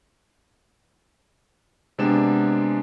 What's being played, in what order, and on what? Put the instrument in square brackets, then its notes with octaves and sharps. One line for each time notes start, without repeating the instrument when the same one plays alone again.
[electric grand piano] C3 G#3 B3 D4 E7